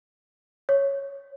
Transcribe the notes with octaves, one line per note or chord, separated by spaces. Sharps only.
C#5